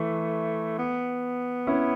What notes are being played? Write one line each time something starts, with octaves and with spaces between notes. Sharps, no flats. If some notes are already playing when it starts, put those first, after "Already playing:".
Already playing: E3 A3
B3
C#4 E4